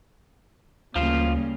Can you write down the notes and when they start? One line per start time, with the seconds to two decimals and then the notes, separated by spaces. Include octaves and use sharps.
0.96 D2 C#3 F3 G3 A#3 F4 F5